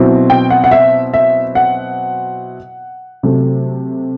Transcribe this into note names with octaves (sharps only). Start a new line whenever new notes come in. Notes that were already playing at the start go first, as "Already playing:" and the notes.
Already playing: B2 F#3 C4 E4
G5
F#5
F#5
E5
E5
F#5
C3 F#3 A3